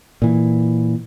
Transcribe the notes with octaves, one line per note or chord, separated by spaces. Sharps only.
A#2 E3